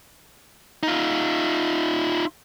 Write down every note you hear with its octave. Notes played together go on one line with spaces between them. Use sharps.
D#4 F4